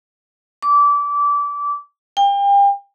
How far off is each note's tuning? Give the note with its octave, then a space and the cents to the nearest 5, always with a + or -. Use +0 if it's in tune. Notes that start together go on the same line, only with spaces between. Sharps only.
D6 -25
G5 +35